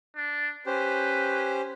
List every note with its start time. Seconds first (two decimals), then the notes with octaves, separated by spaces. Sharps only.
0.16 D4
0.66 C#4 G4 B4 C5